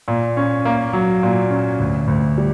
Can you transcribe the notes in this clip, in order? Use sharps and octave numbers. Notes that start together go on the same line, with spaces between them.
A#2
C#4
A#3
F#3
A#2
C#4
D2
D2
G3